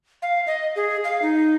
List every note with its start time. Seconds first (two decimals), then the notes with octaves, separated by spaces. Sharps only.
0.22 F5
0.47 D#5
0.76 G#4
1.04 F5
1.22 D#4